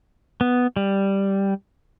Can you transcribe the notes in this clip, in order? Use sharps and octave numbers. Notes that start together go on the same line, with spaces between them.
B3
G3